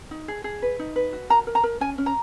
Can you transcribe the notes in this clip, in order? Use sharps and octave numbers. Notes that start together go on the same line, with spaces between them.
D#4
G#4
G#4
B4
D#4
B4
F#4
A#4 A#5
A#4
A#5
A#4
C#4 G#5
C#4
A#5